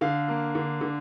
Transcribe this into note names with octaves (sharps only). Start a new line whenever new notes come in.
D3 F5
A#3
D3
D3